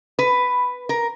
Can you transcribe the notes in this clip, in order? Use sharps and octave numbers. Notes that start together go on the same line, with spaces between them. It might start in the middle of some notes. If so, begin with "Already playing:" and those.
B4
A#4